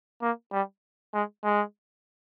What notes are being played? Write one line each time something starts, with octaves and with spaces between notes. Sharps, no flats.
A#3
G3
G#3
G#3